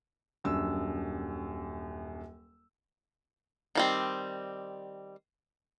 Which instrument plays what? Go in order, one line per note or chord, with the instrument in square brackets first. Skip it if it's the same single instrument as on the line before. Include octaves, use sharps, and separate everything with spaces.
[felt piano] D#1 F#2 D4 E6
[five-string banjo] D#3 G3 C4